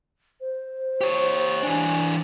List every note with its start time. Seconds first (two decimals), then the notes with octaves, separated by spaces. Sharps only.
0.41 C5
1.01 G4 C#5
1.63 E3 D4 G#5